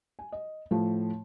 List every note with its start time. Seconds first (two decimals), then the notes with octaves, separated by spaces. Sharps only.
0.19 G#5
0.32 D#5
0.71 A2 F3 A3